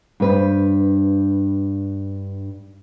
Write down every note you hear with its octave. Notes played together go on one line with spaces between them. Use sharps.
G2 B4 C5